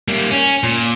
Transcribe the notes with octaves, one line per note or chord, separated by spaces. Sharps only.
G3 A#3
C#4
A#2